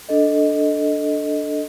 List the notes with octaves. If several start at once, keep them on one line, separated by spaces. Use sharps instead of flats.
D4 A4 D#5